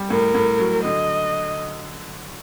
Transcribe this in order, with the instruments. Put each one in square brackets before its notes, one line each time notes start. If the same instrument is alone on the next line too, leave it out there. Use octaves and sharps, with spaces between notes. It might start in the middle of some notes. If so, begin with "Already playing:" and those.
Already playing: [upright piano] G3
[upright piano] A2 [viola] A#4
[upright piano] A2
F#3
[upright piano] D3 [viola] D#5